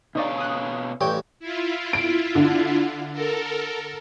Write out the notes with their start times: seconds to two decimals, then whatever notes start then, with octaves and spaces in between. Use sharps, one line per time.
0.15 B2 D#4 C#5 D5 F5
0.38 D#6 F#6
1.01 A1 G2 C#5 G5
1.40 E4 F4
1.93 D7
2.35 D3
3.12 A4 A#4